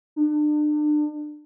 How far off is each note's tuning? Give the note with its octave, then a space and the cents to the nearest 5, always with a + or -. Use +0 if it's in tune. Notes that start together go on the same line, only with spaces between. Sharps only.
D4 +35